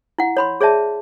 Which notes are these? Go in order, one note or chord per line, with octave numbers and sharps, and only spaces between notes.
E4 F5 F#5
C#5 B5 C6
G#4 C#5 D5 E5 A5